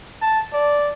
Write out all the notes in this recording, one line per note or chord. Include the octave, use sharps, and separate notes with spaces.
A5
D5